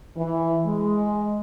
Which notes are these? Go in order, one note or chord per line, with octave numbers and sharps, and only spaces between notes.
E3
G#3